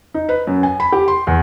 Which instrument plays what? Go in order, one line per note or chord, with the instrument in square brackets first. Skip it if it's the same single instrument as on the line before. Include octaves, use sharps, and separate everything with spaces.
[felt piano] D#4
B4
F#2
G#5
B5
G4
C6
E2